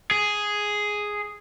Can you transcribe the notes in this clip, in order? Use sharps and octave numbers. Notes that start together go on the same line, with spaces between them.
G#4